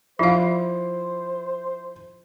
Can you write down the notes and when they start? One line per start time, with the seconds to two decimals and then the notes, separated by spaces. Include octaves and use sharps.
0.19 F3 E4 F4 C5 F5 C7